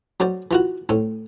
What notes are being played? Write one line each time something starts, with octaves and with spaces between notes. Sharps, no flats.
F#3 C#4 C5 D5
E3 F4 F#4
A2 C4 C#4